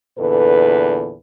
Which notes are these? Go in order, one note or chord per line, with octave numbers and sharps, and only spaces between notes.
E2 A#2 D3 A4 B4